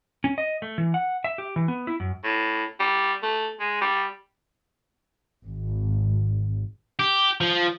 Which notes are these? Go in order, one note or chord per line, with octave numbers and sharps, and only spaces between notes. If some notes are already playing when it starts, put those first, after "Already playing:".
C#4
D#5
A3
E3
F#5
E5
G4
E3
B3
E4
F#2
A2
G3
A3
G#3
G3
G#1
G4
F3